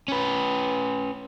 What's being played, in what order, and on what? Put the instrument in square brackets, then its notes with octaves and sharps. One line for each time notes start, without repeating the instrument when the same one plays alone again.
[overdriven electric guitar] C#4 B4